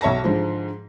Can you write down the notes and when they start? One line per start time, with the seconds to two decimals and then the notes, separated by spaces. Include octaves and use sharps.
0.01 B1 C#5 E5 A5 A#6
0.24 G#2 D3 F3